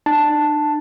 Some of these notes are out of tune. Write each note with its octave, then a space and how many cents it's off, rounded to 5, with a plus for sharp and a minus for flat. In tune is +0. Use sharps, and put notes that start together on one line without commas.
D4 +45 A5 +0